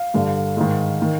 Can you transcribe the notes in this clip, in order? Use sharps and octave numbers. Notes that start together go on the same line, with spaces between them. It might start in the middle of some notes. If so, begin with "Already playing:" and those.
Already playing: F5
G2 D3
G#2 D#3
D#3